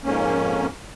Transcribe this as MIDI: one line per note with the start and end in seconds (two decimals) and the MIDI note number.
0.04 0.67 41
0.04 0.67 44
0.04 0.67 58
0.04 0.67 61